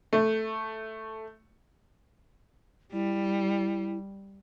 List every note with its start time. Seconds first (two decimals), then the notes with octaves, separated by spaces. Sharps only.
0.13 A3
2.93 G3 E4